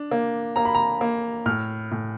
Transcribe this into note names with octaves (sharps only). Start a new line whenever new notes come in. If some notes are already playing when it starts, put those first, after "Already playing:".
Already playing: D4
A#3
A#3 A#5
B5
A#5
A#3
A2 F6
A2